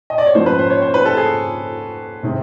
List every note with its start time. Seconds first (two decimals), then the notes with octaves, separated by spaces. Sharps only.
0.10 D#5
0.18 D5
0.26 C#5
0.35 G#2 F3 A#3 C#4 C5
0.46 B4
0.59 C5
0.70 C#5
0.82 C5
0.94 B4
1.06 A4
1.17 G#4
2.23 C3 D#3 G#3 C4